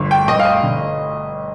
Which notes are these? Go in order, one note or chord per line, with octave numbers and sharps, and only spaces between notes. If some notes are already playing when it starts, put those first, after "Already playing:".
Already playing: G1 D3
G5
G1 D#5
F5
D#5
D3